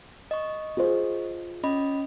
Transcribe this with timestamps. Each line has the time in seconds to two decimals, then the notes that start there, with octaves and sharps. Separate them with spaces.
0.31 D#5 C#6
0.77 F4 G#4 C5
1.63 C#4 D#5 B5